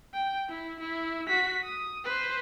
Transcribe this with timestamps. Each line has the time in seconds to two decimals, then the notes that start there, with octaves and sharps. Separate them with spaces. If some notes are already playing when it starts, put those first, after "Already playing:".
0.14 G5
0.49 E4
0.80 E4
1.28 F#4 B6
1.64 D#6
2.04 B4 C5